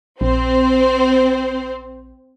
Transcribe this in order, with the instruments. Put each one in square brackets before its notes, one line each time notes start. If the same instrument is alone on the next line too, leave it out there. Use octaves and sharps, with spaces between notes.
[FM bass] A#1 [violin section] C4 C5